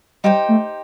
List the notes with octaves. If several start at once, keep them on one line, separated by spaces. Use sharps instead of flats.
G3 D#4 G4 C5 G5
A3